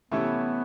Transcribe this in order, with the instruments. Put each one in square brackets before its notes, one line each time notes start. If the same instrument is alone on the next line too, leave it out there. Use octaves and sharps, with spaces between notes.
[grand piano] C3 E3 A3 C#4 E4 [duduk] B3